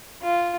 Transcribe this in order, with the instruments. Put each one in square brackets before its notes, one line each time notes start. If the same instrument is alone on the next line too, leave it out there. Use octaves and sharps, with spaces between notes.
[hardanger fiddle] F4